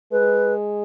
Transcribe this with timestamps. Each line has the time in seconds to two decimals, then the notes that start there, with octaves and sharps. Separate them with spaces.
0.12 G#3 B4